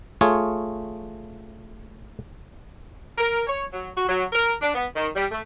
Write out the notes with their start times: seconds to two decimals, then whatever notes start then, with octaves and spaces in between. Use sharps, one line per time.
0.21 A3 F4 G#4 C#5
3.18 A#4
3.47 C#5
3.72 F#3
3.95 F#4
4.08 F#3
4.32 A#4
4.62 D4
4.74 B3
4.95 D#3
5.15 G3
5.31 A3